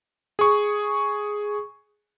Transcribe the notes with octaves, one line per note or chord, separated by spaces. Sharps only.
G#4 C#6